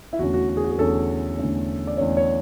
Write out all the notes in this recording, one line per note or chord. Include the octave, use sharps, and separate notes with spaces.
E4
E2 D3 A3 C#4 F#4
F#4
F#4
G#4
F#4
G#4
E2 D3 A3 C#4 A4
E2 D3 A3 C#4
D5
E2 D3 A3 C#4 C#5
C#5